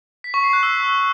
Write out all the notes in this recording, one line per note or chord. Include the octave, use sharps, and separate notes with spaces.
B6
C#6
C7
F#6
E6